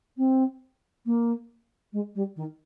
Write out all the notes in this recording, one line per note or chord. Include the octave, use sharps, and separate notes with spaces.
C4
A#3
G#3
G3
D#3